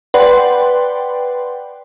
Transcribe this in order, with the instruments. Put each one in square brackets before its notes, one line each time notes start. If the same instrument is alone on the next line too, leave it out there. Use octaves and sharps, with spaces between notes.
[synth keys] B4 D5 F#5 G5 B5 C6